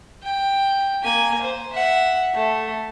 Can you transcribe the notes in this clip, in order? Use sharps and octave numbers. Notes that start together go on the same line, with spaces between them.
G5
A#3 G#5
C5
E5 F#5
A3